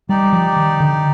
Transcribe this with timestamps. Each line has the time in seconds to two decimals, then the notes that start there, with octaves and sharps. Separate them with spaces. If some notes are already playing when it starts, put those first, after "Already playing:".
0.09 G3 D#4 G4 D5
0.33 F3
0.56 D#3
0.80 D3